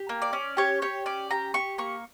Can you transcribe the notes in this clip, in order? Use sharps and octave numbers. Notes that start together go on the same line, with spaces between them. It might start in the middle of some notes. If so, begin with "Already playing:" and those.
Already playing: G4
A#3
D5
C#4
G4 C#5
G4 C#5
C#4 D5
G4 A#5
G4 C#6
A#3 C#6